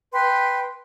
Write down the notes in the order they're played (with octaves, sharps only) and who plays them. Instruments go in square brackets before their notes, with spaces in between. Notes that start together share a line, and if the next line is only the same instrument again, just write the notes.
[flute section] B4 G5 C6